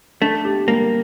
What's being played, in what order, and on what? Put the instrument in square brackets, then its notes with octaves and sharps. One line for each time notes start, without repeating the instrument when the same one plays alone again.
[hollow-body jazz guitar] A3 [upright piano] D4
[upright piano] G4
[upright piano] G3 [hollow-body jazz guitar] A#3